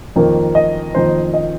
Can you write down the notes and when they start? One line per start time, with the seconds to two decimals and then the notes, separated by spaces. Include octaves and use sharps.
0.16 F2 D#3 A#3
0.55 D#5
0.95 F2 D#3 A#3 C5
1.34 D#5